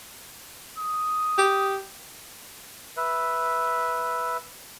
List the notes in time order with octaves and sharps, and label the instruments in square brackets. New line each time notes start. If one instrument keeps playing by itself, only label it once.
[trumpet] D#6
[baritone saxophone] G4
[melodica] B4 E5